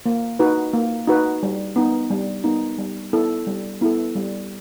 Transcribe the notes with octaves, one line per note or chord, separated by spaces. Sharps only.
A#3
D#4 F#4 B4
A#3
D#4 F#4 B4
G3
B3 D#4
G3
B3 D#4
G3
B3 E4 A4
G3
B3 E4 A4
G3